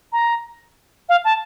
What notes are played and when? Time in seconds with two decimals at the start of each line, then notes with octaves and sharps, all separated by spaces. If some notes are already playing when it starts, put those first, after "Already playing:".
0.12 A#5
1.09 F5
1.25 A5